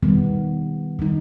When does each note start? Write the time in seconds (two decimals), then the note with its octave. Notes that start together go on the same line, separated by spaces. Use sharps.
0.03 D#3 G3 B3
0.99 D#3 G3 D#4